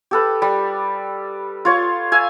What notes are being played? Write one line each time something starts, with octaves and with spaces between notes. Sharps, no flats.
G4 A4 B4
G3
F4 C#5
E5 F5 G#5